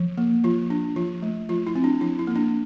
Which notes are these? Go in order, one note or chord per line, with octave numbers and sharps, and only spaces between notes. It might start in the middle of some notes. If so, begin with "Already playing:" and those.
Already playing: F3
A#3
F3 F4
D4
F3 F4
A3
F3 F4
E4
C4
D4
F3 E4
E4
A#3
D4